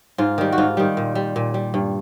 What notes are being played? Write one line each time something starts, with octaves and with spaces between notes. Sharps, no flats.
G#2 F4
D#3 G3
F#4
G#2 F4
D#3 G3
A#2
G3
A#2
G3
G2